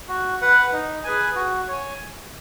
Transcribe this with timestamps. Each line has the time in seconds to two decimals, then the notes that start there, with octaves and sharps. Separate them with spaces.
0.08 F#4
0.41 B4 F#5
0.73 D#4
1.04 G#4 B4 G#5
1.36 F#4
1.68 C#5 G#5